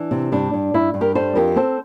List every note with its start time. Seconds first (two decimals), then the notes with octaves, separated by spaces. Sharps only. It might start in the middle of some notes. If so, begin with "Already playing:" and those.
Already playing: E3 D4
0.11 C3
0.32 G2 D4
0.53 G2
0.74 G2 E4
0.94 G2
1.01 G4 A#4
1.15 G3 A4 C5
1.35 F2 G4 A#4
1.56 C4 A4 C5